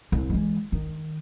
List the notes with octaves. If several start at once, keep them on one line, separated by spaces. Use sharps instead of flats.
C2
E3 G#3
D#3